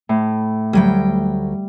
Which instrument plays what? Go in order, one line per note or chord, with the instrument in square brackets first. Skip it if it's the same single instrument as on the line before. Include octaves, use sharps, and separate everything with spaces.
[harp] A2
[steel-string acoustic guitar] D2 F#3 G5 [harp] G3